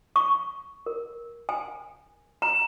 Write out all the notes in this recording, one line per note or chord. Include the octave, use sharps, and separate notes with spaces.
C#6
A#4
G#5
A#5